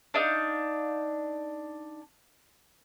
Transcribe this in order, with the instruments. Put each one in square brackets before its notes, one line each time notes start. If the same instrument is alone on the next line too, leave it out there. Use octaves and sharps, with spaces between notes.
[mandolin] D4 D#4 F5